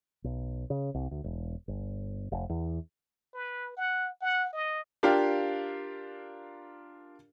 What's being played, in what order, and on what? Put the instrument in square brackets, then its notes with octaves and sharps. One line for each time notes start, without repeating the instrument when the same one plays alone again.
[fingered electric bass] B1
C#3
C2
D2
E1
G1
F1
E2
[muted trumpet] B4
F#5
F#5
D#5
[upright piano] D4 F4 G4 A#4 F5